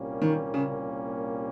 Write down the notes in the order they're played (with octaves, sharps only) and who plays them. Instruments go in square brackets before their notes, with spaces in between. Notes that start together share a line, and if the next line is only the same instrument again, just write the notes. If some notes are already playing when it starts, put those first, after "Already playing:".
Already playing: [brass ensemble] C2 A#2 G3 A#3 C#4
[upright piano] D#3
C#3